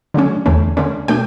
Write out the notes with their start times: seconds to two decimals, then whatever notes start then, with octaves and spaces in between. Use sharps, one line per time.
0.14 D3 F#3 A3 C#4
0.46 E2 D3 A3 C#4
0.77 D3 A3 C#4
1.08 B2 A3 D4 G5